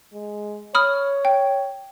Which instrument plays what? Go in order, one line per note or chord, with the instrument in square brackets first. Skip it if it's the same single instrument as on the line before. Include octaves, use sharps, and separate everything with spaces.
[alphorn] G#3
[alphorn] C#5 [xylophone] B5 D#6 F6
[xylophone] G5